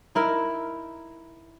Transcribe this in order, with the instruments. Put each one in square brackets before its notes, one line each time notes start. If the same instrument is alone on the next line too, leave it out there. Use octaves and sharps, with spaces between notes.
[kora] D#4 E4 A#4